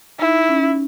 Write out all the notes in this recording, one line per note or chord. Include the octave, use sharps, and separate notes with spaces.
D#4 E4
C#4